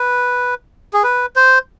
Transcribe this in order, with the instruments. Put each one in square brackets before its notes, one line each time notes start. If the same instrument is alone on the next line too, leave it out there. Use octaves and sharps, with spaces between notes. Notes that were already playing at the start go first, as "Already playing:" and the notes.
Already playing: [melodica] B4
G#4
B4
C5